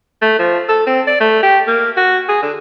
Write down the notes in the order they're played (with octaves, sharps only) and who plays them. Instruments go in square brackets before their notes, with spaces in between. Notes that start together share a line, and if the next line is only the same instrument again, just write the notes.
[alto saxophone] A3
F3
A4
C4
D5
A3
G4
A#3
F#4
G#4
D3